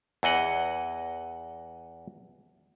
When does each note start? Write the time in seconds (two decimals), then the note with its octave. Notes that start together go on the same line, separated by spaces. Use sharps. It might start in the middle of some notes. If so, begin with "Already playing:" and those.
0.23 E2 E3 D#5 F#5